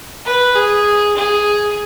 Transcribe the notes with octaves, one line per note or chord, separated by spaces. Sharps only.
B4
G#4
G#4